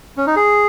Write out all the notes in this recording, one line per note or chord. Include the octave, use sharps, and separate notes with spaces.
C#4
D#4
G#4